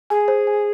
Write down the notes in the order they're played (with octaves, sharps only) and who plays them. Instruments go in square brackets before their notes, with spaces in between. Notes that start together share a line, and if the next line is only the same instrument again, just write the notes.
[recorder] G#4 [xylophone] G#5
[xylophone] C5
G#5